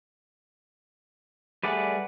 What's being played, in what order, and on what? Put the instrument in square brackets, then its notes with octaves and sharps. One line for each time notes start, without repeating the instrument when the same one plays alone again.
[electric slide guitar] G3 A3 G#4 [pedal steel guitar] B4 D5 F#5